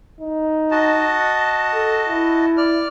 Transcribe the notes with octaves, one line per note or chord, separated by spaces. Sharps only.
D#4
F#4 D#5 A5
A4
E4
D5 F6